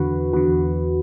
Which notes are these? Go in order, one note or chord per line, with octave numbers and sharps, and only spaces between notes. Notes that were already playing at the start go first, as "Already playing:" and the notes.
Already playing: E2 D3 F#4 B4
E2 D3 F#4 B4